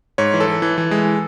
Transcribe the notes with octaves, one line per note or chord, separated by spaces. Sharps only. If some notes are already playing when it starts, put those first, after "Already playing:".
G#2 C#5
E3
A4
E3
E3
E3
G#3